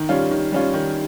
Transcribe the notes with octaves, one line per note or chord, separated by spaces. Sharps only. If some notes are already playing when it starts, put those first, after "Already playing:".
Already playing: D#3
G3 C#4 F4
D#3
G3 C#4 F4
D#3